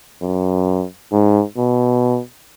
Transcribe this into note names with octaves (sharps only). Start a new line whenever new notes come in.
F#2
G#2
B2